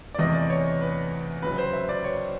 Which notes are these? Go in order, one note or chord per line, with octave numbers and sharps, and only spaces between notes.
D5
E2 C3 E3 A3 D#5
D5
C#5
B4
C#2 C#3 F#3 B4
C5
E5
D5
C#5